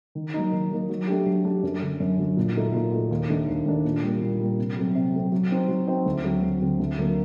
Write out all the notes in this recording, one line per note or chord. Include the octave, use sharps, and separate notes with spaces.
D#3
F#3 A#3 D#4
D#3
F#3 A#3 D#4
F#3
A3 D4 G4
F#3
A3 D4 G4
F#2
D3 F#3
F#2
D3 F#3
A#2
A3 D#4 F#4
A#2
A3 D#4 F#4
D#2
D#3 A3 D4
D#2
D#3 A3 D4
A#2
G3 A#3
A#2
G3 A#3
C3
F#3 A3 C4
C3
F#3 A3 C4
F#3
C4 D#4 F#4 C5
F#3
C4 D#4 F#4 C5
D2
D3 F#3 C4
D2
D3 F#3 C4
D2
D3 F#3 A#3